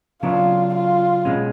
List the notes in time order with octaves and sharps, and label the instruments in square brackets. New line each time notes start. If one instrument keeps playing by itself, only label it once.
[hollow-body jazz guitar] C#3 F#3 B3 D4 [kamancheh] F4
[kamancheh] F4
[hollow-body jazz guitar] B2 G#3 C#4